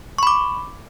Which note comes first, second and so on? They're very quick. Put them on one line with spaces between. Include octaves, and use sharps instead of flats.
C#6 B5 D6